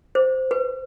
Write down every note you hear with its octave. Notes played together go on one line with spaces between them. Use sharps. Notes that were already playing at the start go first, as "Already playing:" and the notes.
C5
B4